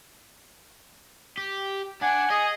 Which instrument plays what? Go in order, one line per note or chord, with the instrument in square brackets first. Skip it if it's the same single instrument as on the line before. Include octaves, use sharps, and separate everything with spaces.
[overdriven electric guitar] G4
[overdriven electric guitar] D4 [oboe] F#5 [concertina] G#5
[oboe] G#4 [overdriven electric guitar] D#5